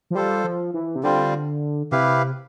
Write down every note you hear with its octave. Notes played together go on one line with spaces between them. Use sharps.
F3
G3 F4 A4 C5
F3
E3
C3
D3 G3 C4 F4
C3 E4 G4 B4 F5